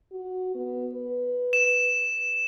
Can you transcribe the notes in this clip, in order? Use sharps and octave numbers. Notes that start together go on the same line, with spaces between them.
F#4
B3
B4
E7